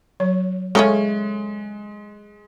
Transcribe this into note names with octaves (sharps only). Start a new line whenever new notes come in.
F#3 C#5
C#3 G#3 A3 C#4 A4 C#5